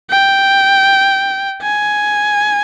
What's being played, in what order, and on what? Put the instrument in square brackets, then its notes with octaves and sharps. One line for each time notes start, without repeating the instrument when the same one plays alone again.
[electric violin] G5
G#5